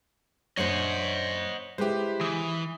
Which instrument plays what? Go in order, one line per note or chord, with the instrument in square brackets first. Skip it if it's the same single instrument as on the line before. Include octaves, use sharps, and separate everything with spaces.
[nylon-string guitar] F#2 A3 D4 [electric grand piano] C5 C#5 [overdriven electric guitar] D#5 F#5
[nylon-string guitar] G#3 E4 [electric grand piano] G4 B4 C5
[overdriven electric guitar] E3 [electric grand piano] D#6